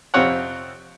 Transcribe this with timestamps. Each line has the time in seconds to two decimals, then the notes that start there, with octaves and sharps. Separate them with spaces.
0.14 F2 C3 C4 F4 C#5 F#5